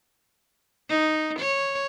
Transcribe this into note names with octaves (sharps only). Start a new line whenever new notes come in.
D#4
C#5